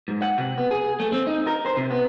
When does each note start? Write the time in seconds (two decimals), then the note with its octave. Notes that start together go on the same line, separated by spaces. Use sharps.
0.08 G#2
0.22 F#5
0.38 C3
0.58 B3
0.71 G#4
1.00 A3
1.12 C4
1.27 D#4
1.47 A#4
1.66 C5
1.77 C3
1.91 B3